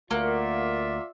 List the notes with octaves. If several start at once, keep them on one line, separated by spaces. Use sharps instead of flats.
D2 A3 A#3 F4 F#4 D5 E5